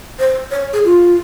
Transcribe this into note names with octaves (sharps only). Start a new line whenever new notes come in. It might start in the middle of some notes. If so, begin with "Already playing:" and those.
C5
C#5
G#4
F4